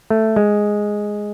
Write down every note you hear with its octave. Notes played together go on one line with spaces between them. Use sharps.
A3
G#3